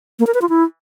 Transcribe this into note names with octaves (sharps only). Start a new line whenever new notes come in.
A#3
A#4
B4
F4
E4